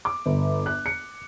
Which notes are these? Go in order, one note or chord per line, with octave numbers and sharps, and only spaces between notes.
D6
G1
F#6
C#7